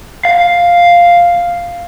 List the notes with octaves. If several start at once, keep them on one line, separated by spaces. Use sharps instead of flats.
F5